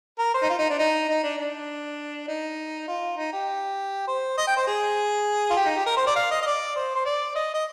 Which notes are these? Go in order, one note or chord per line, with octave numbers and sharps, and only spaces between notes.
A#4
C5
D#4
F4
D#4
D4
D#4
D#4
D4
D4
D#4
F4
D#4
G4
C5
D#5
G5
C5
G#4
F4
G4
D#4
G4
A#4
C5
D5
F5
D#5
D#5
D5
C5
C5
D5
D#5
D#5